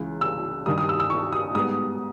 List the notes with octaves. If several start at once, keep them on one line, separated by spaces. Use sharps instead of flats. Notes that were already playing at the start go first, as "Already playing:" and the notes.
Already playing: C#2 C#3 E3
E6
G2 D#3 G3 D#6
D#6
E6
E6
C#6
D#6
G#2 G3 B3 D#6